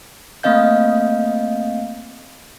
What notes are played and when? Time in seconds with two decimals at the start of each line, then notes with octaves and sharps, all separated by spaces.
0.43 A3 A#3 C4 D#5 F5 G6